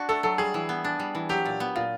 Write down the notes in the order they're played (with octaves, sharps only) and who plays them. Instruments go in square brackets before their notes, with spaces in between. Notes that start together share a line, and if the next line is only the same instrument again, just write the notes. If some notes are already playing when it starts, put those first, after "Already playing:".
Already playing: [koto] D4 F#4
[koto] A3 [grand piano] A4
[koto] F#3 [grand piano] A4
[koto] G3 [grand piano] G#4
[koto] E3
B3
D4
G3
E3
[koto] F#3 [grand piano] G4
[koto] A#2
B3
[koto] A#2 [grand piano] F4